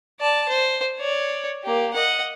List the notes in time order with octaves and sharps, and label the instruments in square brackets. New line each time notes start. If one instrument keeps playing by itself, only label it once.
[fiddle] D5 A5
C5
C#5 D5
A#3 G4
D#5 F#5